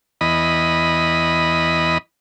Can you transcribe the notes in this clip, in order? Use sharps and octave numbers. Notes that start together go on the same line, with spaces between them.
E2 D#5 B5